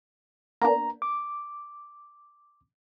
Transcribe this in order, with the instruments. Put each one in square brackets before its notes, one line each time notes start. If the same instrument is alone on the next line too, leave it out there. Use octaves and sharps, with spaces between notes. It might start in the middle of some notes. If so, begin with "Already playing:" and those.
[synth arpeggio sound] A#3 B3 D4 [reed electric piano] A#5
[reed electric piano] D6